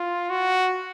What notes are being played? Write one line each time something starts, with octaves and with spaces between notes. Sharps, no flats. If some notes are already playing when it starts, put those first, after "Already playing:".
Already playing: F4
F#4